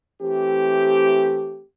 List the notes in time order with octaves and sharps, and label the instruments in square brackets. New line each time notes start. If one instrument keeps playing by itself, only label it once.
[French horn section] E3 A3 C4 G4